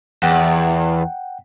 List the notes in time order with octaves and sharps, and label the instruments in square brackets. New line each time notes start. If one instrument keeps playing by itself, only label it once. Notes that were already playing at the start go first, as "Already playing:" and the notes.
[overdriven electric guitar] E2 [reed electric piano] F#5 G5